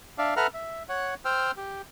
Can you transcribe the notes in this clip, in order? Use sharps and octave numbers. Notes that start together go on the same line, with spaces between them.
D4 D5 E5 F5
A4 B4 E5 F#5 A#5 F6
E5
C#5 F#5
C5 G5 E6 F6
G4